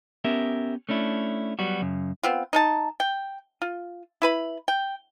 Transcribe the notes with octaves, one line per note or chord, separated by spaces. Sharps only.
B3 C#4 G4 A#4 E5
A3 C#4 D4 E4
F#3 G3 B3 F#4
F#2 C#3
B3 C4 F4
D#4 A#4 A5
G5
F4
E4 B4 B5
G5